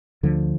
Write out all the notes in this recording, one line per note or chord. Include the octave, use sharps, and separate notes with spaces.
D2 D3 F3